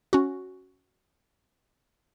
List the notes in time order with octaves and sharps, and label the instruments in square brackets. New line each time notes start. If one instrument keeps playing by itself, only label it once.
[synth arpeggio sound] C#4 F#4